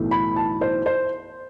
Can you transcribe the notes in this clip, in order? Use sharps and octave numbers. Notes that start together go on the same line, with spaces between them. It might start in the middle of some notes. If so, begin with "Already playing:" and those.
Already playing: B1 A2 E3 A3
B5
A5
C5
C5